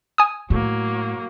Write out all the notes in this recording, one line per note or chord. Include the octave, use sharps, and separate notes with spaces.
G#5 D#6
A2 F#3 A#3